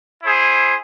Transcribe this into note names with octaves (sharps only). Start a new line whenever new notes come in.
E4 G#4 C5